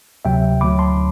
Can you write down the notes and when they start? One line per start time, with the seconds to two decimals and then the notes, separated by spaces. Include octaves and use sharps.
0.25 D2 C3 F#3 E5 G5
0.61 D2 D3 F#3 B5 D6
0.79 A5 C6